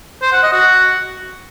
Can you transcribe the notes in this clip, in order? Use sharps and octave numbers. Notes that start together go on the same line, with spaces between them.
C5
F#5
D#5
F#4